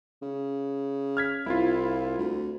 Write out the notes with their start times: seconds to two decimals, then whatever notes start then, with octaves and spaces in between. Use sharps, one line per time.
0.22 C#3
1.17 F6 G#6 B6
1.46 C2 E4 F4
2.19 D2